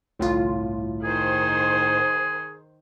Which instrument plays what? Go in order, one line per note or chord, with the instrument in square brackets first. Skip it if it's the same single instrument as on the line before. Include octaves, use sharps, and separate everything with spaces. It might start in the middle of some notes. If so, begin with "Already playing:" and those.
[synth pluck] G1 C2 F4 [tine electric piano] A2
[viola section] D#3 C5 [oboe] G#4